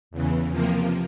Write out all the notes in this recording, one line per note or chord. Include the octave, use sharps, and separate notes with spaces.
E2 C#3 E3
C3 F3 A#3